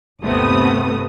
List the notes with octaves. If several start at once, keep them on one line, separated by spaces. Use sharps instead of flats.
G1 D#2 C3 A3 B3 D#6